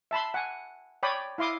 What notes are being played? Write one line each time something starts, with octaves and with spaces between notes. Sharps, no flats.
E5 A5 B5 C6
F#5 G#5
C#5 D5 G5 B5 D#6
E4 F5 C6 D6 D#6